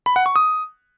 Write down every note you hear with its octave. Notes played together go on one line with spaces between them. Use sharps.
B5
F#5
C#6
D#6